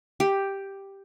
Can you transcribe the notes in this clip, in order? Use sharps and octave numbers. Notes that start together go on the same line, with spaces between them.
G4